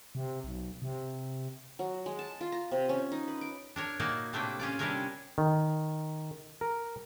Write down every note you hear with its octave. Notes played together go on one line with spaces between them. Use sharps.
C3
B1
C3
F#3
G#3
A5
F4
A#5
C3
C#4
D#4
B4
D6
D4 A#4 C#5
A#2 A#3 D#4 F#4 A#4 A5
A2 C3 A3 A#3 D4 G5
C#4 F4 D5
C3 G3 C#4 D4 A#4 C#5
D#3
A#4